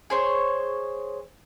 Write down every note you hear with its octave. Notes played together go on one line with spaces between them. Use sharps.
G#4 C5 C#5